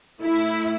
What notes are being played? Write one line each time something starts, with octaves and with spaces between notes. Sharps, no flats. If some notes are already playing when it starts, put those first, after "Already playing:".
A3 E4